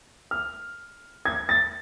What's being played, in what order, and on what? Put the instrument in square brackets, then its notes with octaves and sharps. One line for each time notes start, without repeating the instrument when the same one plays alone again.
[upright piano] F6
G#6
A6